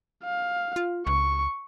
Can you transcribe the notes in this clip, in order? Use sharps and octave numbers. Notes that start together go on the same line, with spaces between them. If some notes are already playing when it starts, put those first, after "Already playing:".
F5
F4
C#2 C#6